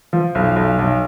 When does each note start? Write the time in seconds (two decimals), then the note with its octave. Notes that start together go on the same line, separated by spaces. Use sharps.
0.13 F3
0.35 B1
0.56 B1
0.79 B1